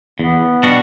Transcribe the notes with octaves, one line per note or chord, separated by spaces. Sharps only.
E2 B3
B2 G3 D4 F#4